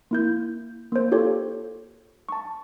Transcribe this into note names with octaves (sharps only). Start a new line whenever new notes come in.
A#3 E4 G6
A#3 C5
F4 G4 A4 C#5
A5 C#6